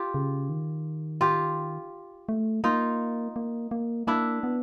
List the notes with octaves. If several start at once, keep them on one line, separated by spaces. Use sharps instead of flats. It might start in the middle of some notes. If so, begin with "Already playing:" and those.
Already playing: F4 G4
C#3
D#3
F4 G4
A3
A#3 D#4 F4
A#3
A#3
A#3 D4 E4
B3